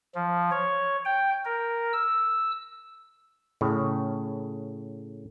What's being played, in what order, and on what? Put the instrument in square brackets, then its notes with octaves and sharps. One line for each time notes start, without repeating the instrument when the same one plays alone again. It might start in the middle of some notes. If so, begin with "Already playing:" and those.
[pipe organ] F3
C#5
G5
A#4
E6
[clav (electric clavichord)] A2 C#3